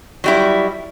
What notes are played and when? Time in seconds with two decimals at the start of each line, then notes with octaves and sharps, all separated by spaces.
0.24 F#3 G3 E4